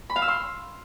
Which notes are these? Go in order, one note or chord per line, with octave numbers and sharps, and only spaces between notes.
B5
F5
E6
C6